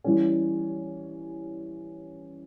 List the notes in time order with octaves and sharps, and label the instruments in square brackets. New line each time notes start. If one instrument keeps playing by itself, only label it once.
[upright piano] E3 G3 C#4